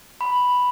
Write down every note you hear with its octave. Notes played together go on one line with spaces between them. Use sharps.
B5